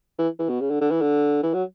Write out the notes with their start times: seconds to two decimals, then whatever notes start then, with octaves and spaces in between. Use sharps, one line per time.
0.19 E3
0.39 E3
0.49 B2
0.61 C#3
0.71 D3
0.81 D3
0.91 E3
1.01 D3
1.43 E3
1.54 F#3